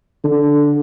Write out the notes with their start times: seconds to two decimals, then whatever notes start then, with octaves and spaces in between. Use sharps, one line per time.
0.24 D3